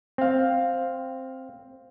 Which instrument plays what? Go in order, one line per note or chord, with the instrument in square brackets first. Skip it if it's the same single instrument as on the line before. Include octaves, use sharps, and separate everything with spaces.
[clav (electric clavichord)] C4 F5